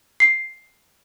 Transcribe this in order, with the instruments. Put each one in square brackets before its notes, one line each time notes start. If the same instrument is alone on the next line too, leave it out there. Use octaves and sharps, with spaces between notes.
[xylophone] C7